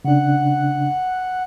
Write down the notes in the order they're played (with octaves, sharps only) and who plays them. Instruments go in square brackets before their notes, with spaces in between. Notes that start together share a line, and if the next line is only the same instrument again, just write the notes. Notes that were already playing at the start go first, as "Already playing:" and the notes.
[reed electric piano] C#3 D4 [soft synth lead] F#5